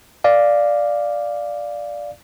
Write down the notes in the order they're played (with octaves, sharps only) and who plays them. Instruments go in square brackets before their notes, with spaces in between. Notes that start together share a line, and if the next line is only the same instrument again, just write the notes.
[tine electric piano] D5 F5